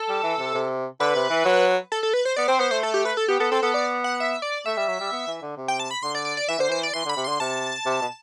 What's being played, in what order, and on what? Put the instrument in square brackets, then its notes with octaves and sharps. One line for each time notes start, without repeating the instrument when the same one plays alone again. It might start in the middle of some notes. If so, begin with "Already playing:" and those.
Already playing: [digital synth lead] A4
[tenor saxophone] G3
E3
C3
C3
[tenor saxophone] D3 [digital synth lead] B4
[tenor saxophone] C3
E3
F#3
[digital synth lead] A4
A4
B4
C5
[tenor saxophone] B3 [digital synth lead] D5
[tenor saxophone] C4 [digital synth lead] C5
[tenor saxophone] B3 [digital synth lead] C5
[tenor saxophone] A3 [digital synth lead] C5
[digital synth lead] A4
G4
B4
A4
[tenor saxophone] B3 [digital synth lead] G4
[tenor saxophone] B3 [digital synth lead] A4
[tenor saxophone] C4 [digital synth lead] A4
[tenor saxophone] B3 [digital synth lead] A4
[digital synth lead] D5
F#5
E5
D5
[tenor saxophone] A3 [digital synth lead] E5
[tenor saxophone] G3
F#3
G3
B3
E3
D3
C3
[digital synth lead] G5
A5
B5
[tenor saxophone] D3 [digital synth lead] C6
[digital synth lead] D5
D5
D5
[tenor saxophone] E3 [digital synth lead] E5
[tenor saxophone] D3 [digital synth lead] C5
[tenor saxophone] E3 [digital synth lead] C5
[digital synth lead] D5
[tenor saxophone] E3 [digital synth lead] C6
[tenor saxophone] D3 [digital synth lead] B5
[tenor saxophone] C3
[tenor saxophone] D3 [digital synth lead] C6
[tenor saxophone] C3 [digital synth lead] A5
[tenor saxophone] C3
B2